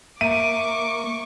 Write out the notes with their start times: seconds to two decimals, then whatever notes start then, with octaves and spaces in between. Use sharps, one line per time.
0.21 A#3 E5 C#6 D6 D#7